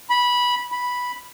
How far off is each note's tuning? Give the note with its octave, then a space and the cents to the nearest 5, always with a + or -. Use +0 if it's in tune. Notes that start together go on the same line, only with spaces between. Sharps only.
B5 -15
B5 -5